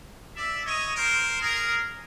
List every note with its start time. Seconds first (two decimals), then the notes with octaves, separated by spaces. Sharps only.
0.36 D5 E5
0.65 C#5 D#5
0.96 A#4 C5
1.41 G#4 A#4